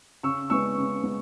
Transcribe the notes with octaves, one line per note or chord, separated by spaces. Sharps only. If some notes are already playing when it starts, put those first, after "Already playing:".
C#3 C#6 E6
G#3 B3 C#6 E6
C#3
G#3 B3